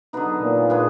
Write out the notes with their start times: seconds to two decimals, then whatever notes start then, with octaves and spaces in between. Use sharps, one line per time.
0.13 D3 F#3 B3 D#4
0.40 A#2
0.70 G#3 B3 D4 G#4